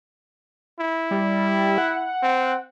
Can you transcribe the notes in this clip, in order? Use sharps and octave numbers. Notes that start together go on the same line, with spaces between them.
E4
G3
F#5
C4